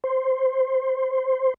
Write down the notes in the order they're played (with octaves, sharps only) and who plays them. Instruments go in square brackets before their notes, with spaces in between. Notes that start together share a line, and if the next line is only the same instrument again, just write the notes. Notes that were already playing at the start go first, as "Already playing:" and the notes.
[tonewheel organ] C5